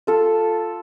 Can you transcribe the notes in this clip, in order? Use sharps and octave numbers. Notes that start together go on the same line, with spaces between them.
F4 A4